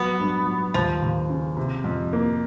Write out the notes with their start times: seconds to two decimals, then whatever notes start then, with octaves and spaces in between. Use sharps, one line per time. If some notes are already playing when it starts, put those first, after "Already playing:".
Already playing: F#3 B3
0.20 G2
0.46 F#3
0.74 D#2 F3
1.02 D#2
1.30 C#3
1.57 C3
1.84 F2
2.13 A#3